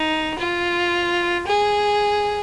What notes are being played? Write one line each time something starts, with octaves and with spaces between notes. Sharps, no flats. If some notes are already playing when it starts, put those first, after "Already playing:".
Already playing: D#4
F4
G#4